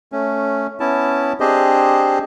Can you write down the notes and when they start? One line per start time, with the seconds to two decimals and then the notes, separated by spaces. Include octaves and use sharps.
0.12 A3 C#4
0.80 B3 C#4 E4 A5
1.40 C4 D4 G4 G#4 C5 D#5